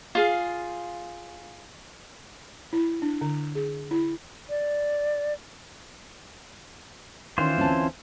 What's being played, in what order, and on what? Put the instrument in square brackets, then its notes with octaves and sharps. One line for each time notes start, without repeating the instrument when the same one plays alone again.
[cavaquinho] F4 G#4 F5
[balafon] E4
D4
D3
G#4
E4
[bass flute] D5
[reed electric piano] D#3 C#4 [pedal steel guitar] E3 F4 C5
[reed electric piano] D2 A5 [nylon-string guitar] C4 C#4